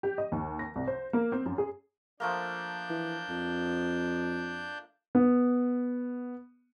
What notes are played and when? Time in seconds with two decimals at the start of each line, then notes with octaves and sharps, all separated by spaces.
0.03 G4
0.18 D#5
0.32 D#2
0.59 A#6
0.76 C2
0.87 C5
1.13 A#3
1.32 C4
1.46 F#2
1.58 G#4
2.20 F3 A3 A#3 D4 G6
2.90 E3
3.29 F2
5.15 B3